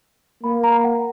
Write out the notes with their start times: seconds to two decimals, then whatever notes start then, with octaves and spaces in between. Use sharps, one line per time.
0.43 A#3 B5
0.64 A#5
0.84 F#5